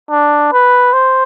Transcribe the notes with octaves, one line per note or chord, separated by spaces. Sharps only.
D4
B4
C5